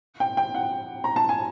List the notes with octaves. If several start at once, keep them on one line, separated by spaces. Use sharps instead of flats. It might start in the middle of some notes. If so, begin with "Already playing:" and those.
G5
G5
F#5
A#5
A5
G#5